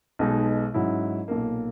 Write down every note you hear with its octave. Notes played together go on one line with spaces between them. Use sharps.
B1 B2 G#3 D#4
G#2 F#3 C#4 E4
B1 A#2 A#3